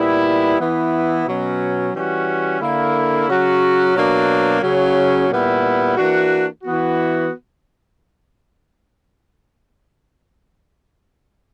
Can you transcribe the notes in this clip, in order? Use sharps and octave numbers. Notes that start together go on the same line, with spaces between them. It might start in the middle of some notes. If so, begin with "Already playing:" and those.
Already playing: A#2 G3 B3 E4
E3 B3 E4
B2 F#3 C#4
E3 G3 C#4 F#4
D3 A#3 E4
C#3 F#3 C#4 F#4
B2 F#3 A#3 D4
C#3 F#3 C#4
A#2 G3 B3 E4
E3 A#3 D4 F#4
E3 B3 F#4